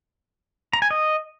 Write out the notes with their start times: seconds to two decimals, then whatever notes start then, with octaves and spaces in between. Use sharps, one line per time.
0.73 A#5
0.82 G#5
0.91 D#5